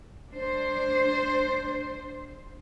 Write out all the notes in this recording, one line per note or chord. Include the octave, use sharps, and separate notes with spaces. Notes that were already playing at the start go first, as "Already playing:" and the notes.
D4 C5